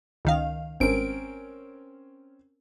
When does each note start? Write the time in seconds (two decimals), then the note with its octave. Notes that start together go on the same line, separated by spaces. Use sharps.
0.25 C#2 D#3 F5
0.80 G#1 C4 C#4 A#4 D7